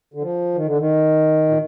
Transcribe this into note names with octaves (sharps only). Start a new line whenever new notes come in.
D3
F3
D#3
D3
D#3
A#2